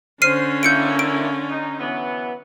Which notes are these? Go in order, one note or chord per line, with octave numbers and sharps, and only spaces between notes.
D3 C#4 C5 F6 C7 D#7
A#3 E4 G6 C#7 D7
D7
D#4
E3 F#3 B3